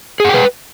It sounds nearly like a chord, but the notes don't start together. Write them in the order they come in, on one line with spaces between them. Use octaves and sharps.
G#4 F#5 G5 B4